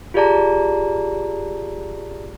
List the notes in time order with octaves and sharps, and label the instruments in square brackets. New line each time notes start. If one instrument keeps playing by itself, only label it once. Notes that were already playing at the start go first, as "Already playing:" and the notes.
[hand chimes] F4 G4 G#4 D5 A5 A#5